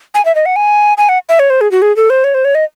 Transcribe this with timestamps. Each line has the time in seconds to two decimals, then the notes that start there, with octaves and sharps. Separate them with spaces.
0.14 G#5
0.25 E5
0.35 D#5
0.46 F#5
0.56 G#5
0.98 G#5
1.09 F#5
1.29 E5
1.39 C#5
1.50 C5
1.61 G#4
1.71 F#4
1.82 G#4
1.96 A4
2.10 C5
2.24 C#5
2.34 C5
2.45 C#5
2.55 D#5